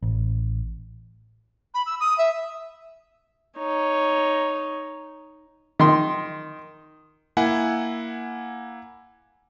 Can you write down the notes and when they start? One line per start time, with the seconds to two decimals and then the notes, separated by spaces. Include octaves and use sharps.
0.02 A1
1.74 B5
1.86 E6
2.00 D#6
2.18 E5
3.58 D#4 C#5
5.79 D#3 C6
7.37 A#3 E4 F#5 G#5